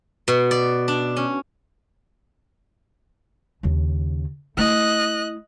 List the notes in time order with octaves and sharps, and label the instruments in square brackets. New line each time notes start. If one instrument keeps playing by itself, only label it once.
[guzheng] B2
D5
D4
C#4
[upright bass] D#2 C#3
[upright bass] A3 E4 [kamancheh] D#5 F#6